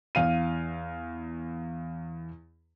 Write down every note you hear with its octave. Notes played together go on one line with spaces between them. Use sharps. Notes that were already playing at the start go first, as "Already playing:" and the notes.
E2 F5 D#7